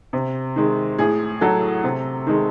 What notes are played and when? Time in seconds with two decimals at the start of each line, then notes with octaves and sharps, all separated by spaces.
0.13 C3
0.56 D#3 G#3
0.98 A2 G#4
1.41 F#3 A4
1.84 C3
2.27 D#3 G#3